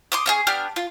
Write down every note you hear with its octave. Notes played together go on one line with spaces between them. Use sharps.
C6 D6 D#6
C#4 F4 G#4
B3 D4 G4 F6
F4